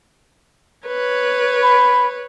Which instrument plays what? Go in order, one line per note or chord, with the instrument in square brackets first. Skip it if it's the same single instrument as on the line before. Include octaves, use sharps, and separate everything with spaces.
[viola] B4 C#5
[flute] B5